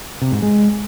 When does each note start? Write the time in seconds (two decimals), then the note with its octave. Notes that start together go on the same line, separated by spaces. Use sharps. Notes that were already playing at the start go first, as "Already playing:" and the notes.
0.22 C3
0.32 G#2
0.42 G#3